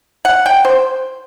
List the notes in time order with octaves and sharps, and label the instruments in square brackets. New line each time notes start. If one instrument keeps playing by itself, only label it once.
[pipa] F#5
G5
C5